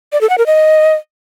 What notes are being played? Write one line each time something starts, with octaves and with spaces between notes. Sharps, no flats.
D5
A4
F#5
A#4
D#5